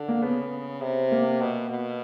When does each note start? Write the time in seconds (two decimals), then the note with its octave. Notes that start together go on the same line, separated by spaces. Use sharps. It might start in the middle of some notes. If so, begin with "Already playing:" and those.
Already playing: D3
0.08 A#3
0.22 C#3 B3
0.81 C3
1.12 A#3
1.41 B2
1.70 B2